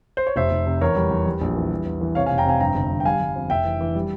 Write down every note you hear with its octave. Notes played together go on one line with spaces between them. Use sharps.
C5
C#5
F1 C5 E5
F1
C3
E2 A#4 C#5
G3
E2
G3
A#1
E3
G3
E2
E3
C3 C#5 F5
F5 G#5
F1
G5 A#5
C3 F5 G#5
G2 G5 A#5
G1
G1
G5
G3 F5 G#5
G3
F2
F1 E5 G5
E3
E3
G3